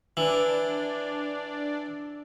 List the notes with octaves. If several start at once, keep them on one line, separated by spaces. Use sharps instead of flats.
E3 D4 D5